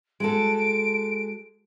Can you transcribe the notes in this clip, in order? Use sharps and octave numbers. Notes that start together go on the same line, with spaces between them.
G#3 F#4 A4 D7